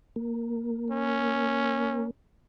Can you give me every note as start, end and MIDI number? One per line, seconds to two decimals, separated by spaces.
0.16 2.10 58
0.90 2.05 61